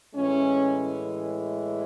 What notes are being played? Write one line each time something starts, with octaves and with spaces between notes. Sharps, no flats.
A2 E3 G#3 C#4